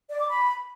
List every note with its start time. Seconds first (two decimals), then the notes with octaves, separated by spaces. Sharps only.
0.09 D5
0.20 D6
0.30 B5